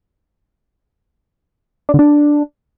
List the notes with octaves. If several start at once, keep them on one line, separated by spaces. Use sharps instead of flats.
D4
D3
D4